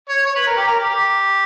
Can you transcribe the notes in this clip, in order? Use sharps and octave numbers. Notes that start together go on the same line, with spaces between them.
C#5
C#5
B4
A#4
G4
A#4
G4
G4